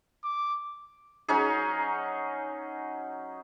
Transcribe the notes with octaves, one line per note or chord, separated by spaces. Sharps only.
D6
F#3 C#4 D#4 G#4